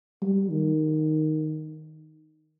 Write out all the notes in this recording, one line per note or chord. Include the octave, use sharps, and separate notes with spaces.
G3
D#3